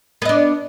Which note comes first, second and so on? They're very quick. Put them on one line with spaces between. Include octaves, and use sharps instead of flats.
B3 D#5 D4